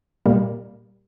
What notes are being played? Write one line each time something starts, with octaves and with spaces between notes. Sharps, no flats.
A#2 G3 A#3